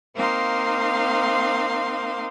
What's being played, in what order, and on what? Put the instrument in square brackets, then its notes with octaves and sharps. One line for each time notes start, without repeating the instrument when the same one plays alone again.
[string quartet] A#3 C4 D#4 F5 C6